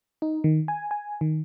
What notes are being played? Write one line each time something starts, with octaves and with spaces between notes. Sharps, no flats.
D#4
D#3
G#5
G#5
D#3